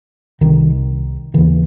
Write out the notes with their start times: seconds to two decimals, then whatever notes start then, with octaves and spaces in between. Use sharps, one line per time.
0.41 C2 C3 D#3
1.34 D#2 C#3 E3